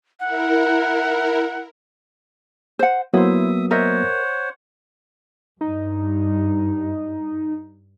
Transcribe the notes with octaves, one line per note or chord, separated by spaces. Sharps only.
E4 A#4 F#5
C5 F#5
F#3 A#3 B3 E4 C5 E5 D#6
A#4 C5 C#5 D#5 E5 F#5
G2 D#4